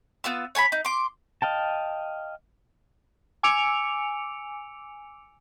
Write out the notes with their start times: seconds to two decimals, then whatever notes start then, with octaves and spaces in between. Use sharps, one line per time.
0.24 B3 F4 E6
0.55 C#5 G#5 A5 B5
0.72 D#4
0.85 C6 D6
1.42 D#5 F5 G5 A5
3.43 G#5 D6 E6 C#7 D7 F7